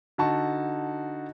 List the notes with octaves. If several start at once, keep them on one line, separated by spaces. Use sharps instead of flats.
D3 D#4 F#4 A5 C#6